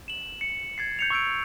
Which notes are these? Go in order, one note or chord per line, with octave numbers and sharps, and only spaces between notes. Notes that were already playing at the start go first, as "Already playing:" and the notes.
E7 F#7
C#7
G#6 A6 C7
G6 C#7 F7
C#6 E6 G6 D7